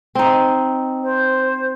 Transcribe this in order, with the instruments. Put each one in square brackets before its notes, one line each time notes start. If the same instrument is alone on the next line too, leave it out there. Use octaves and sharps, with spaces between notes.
[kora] C4 D#4
[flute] C5